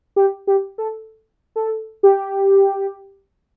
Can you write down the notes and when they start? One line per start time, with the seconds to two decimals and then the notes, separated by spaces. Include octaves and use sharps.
0.16 G4
0.47 G4
0.78 A4
1.56 A4
2.03 G4